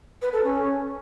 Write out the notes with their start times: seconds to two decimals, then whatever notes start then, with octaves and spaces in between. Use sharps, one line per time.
0.22 B4
0.33 A4
0.44 C#4